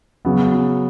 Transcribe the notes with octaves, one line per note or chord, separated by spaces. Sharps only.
C#3 F#3 B3